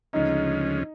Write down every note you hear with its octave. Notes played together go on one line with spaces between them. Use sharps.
D2 C#3 F3 G#3 C#4 D#4